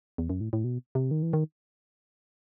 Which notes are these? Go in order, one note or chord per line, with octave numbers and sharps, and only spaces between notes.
E2
F#2
A2
A2
B2
C3
D#3
E3
D#3